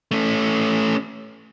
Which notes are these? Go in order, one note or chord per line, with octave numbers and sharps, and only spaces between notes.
A3 C#4